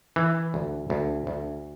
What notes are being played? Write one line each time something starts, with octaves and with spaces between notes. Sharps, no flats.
E3
D2
D2
D2